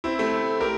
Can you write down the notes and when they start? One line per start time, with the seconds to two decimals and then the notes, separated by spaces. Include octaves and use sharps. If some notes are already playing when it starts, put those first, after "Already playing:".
0.04 C4 E4
0.18 A3 C4
0.61 G4 A#4